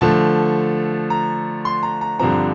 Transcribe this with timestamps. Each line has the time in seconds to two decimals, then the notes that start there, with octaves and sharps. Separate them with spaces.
0.01 D3 F3 A3 A5
1.10 A#5
1.65 C6
1.83 A#5
2.01 A#5
2.19 G2 D3 F3 C4 A#5